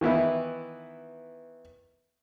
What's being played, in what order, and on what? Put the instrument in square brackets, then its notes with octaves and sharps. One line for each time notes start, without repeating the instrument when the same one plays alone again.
[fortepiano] D#3 E3 B3 E4